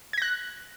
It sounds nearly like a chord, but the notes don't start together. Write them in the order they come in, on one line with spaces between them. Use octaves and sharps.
G#6 A#6 F#6